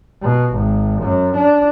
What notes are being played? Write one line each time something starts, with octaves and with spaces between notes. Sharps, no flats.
B2
G#1
F#2
D4